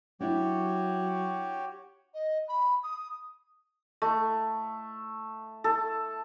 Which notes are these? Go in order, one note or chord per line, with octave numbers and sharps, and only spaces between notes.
F#3 D4 E4 F#4 G4 C#5
D#5
B5
D#6
A3
A4